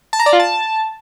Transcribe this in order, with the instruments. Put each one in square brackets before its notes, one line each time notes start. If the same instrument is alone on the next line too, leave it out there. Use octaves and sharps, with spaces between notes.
[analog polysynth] A5
A#5
D5
F4
A5